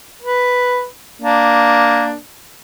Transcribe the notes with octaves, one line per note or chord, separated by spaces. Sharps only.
B4
A#3 D4